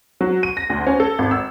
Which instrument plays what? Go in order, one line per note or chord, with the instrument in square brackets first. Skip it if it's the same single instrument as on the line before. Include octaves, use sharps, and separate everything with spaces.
[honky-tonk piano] F#3
D#7
A#6
D2
C#4
A4
G#1
E6